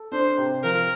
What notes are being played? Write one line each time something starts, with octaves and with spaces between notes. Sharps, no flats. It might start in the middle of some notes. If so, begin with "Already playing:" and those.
Already playing: A4
D4 C5
C3
F3 A#4